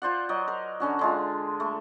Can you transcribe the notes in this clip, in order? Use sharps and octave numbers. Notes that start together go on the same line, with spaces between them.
F4 C5 D5 F#5
F#3 D5 D#5
A#4
D3 C#4 F#4
D3 G#3 F4
A3